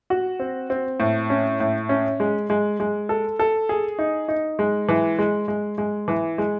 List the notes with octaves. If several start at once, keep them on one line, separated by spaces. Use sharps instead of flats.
F#4
C4
C4
A2
C#4
A2
C#4
G#3
G#3
G#3
A4
A4
G#4
D#4
D#4
G#3
E3
G#3
G#3
G#3
E3
G#3